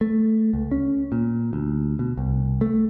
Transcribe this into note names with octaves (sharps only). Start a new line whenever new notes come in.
A3
C#2
C#4
A#2
D2
B2
C2
A3